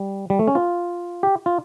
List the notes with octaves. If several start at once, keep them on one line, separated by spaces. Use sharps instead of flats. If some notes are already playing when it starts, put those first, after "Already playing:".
Already playing: G3
G3
A3
C#4
F4
G4
F4